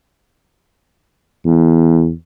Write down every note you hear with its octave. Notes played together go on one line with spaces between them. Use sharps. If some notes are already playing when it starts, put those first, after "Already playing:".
E2